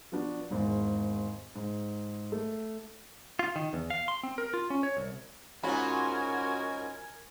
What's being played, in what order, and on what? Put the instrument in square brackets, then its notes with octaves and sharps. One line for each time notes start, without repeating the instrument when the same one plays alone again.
[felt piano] F3 B3 D4 F#4
G#1 E2 G#2
G#2
A3
[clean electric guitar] F4
D#3
E2
F5
C6
C4
A#4
F4
C#4
C#5
C2
[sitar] G#2 C#4 F4 [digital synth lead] F#4 [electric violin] A#4 G#5 [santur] B5